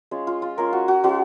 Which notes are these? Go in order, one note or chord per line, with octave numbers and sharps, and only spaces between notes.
G#3 C#4 F4
F4
F4
G#3 C#4 F4 A#4
F#4
F#4
G#3 C#4 F4 F#4